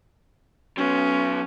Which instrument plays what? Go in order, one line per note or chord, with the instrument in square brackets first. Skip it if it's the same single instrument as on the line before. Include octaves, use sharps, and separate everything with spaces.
[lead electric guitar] F#3 B3 [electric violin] C#4